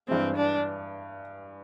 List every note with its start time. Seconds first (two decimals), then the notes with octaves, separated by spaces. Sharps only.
0.08 G2 E3 G#3 C4
0.36 D4